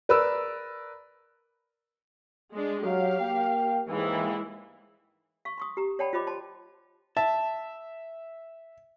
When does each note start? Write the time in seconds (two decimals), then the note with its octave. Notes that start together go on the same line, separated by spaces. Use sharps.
0.09 A#4 B4 D5 E6
2.52 G#3 D4
2.84 F#3 G4 F5
3.20 A#3 G5
3.89 D#2 G#2 E3 G#3 E4
5.45 F5 C#6
5.58 C6 C#6 D#6
5.77 G4 A#5
5.99 C#5 D5 F#5 G5 A5 B5
6.13 F4 C5 D#5 B5 D6
6.27 C5 A5 C6
7.17 E5 A5